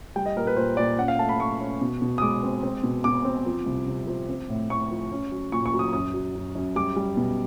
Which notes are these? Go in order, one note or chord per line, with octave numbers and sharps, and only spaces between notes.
G3 G5
D#5
A#2 A#4
B4
A#2 C5
A#2 D5
C#4 F#5
F5
A3 A5
B5
A3 C#6
C#4
B2
B2
D#6
G#3 D6
C4
C4
B2
B2 D6
C4
F3
C2
C3
F3
C4
A2
A2 C#6
F3
C#4
F#3
A#2 C#6
C#6
F#3
D#6
F#2 D#6
F#3
F#2
F#2
G3 D6
G3
B2